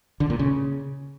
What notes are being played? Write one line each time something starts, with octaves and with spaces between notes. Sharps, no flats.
D3
A#2
C#3